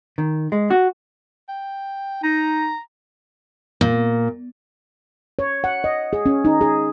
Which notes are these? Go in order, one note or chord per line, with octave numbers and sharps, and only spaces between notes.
D#3
G#3
F#4
G5
D#4 A#5
A#2
C#5
F#5
D#5
G#4
C#4
D#4
G#4